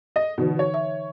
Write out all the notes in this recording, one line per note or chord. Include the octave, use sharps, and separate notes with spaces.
D#5
B2 D3 E3 D#4
C#5
E5